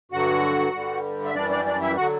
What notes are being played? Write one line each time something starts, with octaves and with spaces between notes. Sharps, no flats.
G2 D3 F#3 F#4 F#5
G2 D3 G3
E5
F#2 E3 G3 D4 D5
D4 D5
D4 D5
E4 E5
D3 F#3 F#4 F#5